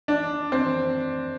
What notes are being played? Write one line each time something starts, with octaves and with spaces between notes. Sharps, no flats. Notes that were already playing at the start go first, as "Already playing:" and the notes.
D4
C4